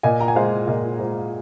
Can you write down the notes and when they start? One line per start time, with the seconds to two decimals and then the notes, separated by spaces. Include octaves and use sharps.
0.03 A#2 D#5 G#5
0.20 A#5
0.28 G#5
0.35 G#3 C5 F5
0.67 A#2 A#4 D#5
0.99 G#3 C5